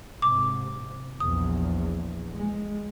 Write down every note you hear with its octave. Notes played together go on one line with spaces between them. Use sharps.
G#2 C3 D6
A#1 E2 D#6
G#3